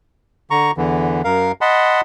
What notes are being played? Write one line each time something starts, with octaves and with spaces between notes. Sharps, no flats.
D3 A#5 C#6
E2 D3 E3
F#2 A#4 F5
D#5 F#5 A5 B5 C6